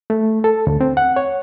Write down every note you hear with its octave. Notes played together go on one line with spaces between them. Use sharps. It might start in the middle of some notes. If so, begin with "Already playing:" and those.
A3
A4
D2
C4
F#5
C#5